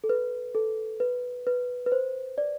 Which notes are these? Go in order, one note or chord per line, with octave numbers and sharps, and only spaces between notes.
A4
B4
A4
B4
B4
B4
C5
D5